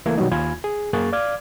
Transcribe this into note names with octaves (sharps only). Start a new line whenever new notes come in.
C#2 E3 A3 A#3 G#6
B2 D#3 F#3 G3 D#4
D#2 F4 G#5 B5 G#6
G#4
F#2 A#3 G#4 C#6 F#6 A6
D5 F5 D6 F6 G#6